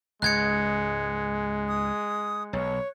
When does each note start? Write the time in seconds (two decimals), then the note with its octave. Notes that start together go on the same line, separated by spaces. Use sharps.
0.22 C#2 G#2 G#3 F#6 G#6 C#7
1.68 D#6
2.53 B1 C#5